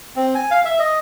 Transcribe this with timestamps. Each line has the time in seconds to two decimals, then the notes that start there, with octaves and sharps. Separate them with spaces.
0.16 C4
0.35 G#5
0.51 F5
0.65 E5
0.79 D#5